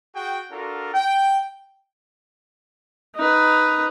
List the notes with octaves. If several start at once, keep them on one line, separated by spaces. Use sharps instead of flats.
F#4 G#4 F#5 G5
D4 F4 F#4 A4 A#4
G5
D#4 B4